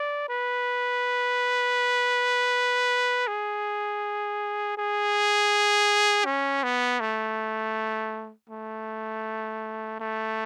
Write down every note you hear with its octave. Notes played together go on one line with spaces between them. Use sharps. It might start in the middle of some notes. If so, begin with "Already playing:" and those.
Already playing: D5
B4
G#4
G#4
C#4
B3
A3
A3
A3